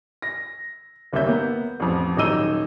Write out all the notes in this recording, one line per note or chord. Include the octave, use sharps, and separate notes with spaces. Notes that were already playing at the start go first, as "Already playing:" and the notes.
A#6
F#1 D#2 G3 C#4 E5 G6
A#3 B3
A1 F2
D#1 F#3 D#4 E6 D#7 G7